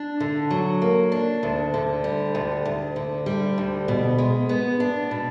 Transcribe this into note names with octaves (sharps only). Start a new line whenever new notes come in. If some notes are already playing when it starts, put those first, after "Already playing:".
Already playing: D4
D3
F#3
A#3
D4
D2
D3
G3
D2
D2
D3
G3
D2
B2
G#3
B3
D4
B2